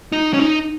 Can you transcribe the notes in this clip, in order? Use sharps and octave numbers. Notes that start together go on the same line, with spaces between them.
D#4
C#4
D#4